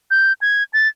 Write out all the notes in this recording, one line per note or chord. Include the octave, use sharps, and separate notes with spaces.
G6
G#6
A6